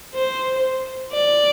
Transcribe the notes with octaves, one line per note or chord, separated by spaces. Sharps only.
C5
D5